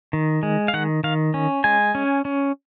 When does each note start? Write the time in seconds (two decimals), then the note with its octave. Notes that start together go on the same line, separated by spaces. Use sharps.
0.13 D#3
0.43 G#3
0.68 F5
0.74 D#3 F#5
1.04 D#3 F5
1.34 C#4
1.64 G#3 G#5
1.95 C#4
2.25 C#4